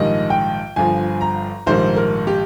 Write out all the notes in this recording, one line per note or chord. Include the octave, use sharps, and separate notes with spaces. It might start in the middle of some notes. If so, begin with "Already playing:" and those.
Already playing: A#1 G#2 D#3 G3 D#5
G5
G1 G2 F3 G#5
A#5
A#1 G#2 D#3 G3 C5
A#4
G4